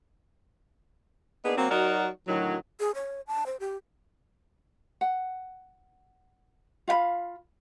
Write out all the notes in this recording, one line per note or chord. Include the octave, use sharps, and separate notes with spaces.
A#3 B3 D4 D#4 G#4
F#3 A#3 C4
F#3 D#4 F#4 A#4 D5 F#5
A2 D3 D#3 F#3
G#4
C#5
A5
C5
G4
F#5
F4 F5 F#5 B5